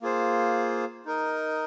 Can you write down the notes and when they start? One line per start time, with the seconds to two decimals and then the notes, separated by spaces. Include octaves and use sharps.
0.02 A#3 F4 G#4 C5
1.05 D#4 A#4 D#5